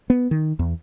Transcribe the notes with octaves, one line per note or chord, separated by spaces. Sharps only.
B3
D#3
E2